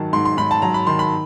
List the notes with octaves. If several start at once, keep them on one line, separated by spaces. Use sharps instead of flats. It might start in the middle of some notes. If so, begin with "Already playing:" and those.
Already playing: G#2 D#3 F#3 A5
G#2 C6
C6
G#2 B5
A5
F#3 A#5
B5
D#3 C6
B5